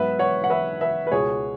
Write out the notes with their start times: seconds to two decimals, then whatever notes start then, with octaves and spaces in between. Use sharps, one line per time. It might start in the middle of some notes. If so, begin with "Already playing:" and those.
Already playing: G#2 F#3 B3 B4 E5
0.19 C#5 F#5
0.44 F#5
0.50 B4 E5
0.81 B4 E5
1.07 B4
1.11 C#2 B2 G#3 G#4 C#5